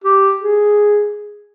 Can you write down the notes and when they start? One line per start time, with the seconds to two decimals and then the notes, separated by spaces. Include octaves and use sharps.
0.04 G4
0.41 G#4